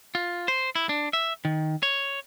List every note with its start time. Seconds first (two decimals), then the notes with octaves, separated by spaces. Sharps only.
0.15 F4
0.48 C5
0.75 E4
0.89 D4
1.13 E5
1.45 D#3
1.83 C#5